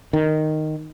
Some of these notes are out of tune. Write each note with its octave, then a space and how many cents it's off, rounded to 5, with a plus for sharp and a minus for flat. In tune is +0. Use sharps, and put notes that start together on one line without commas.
D#3 -5